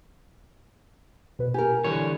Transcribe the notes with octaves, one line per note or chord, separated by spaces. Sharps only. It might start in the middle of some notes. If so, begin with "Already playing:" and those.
B2 B4
G4 A#4 G#5
D3 E3 G3 C#5